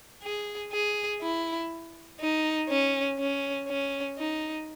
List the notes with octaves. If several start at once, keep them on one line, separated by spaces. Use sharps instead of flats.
G#4
G#4
E4
D#4
C#4
C#4
C#4
D#4